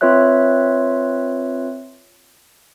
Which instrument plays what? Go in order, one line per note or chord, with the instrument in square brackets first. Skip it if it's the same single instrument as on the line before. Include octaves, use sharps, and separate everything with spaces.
[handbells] C4 F4 B4 C#5 E5 F#6